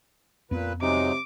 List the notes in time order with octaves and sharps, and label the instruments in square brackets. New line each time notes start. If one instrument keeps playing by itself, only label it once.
[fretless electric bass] F2 B3 [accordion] A#2 B4
[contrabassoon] C3 [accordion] F#3 G#3 D#4 [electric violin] D6